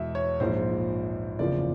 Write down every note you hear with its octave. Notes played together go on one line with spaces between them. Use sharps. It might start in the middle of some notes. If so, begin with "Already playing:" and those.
Already playing: E2 B2 G#3 E5
C#5
A#1 G#2 F3 C5
F#1 E2 C#3 F3 D5